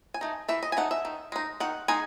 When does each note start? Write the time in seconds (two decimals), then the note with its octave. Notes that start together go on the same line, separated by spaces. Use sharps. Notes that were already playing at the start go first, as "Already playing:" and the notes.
0.14 G#5
0.21 A3 D#4
0.49 E3 E5
0.63 D#5
0.72 G#5
0.77 A3 D#4 F#5
0.91 E5
1.05 D#3
1.32 G#3 D#4
1.60 D#3 F#5
1.88 G#3 D#4 G#5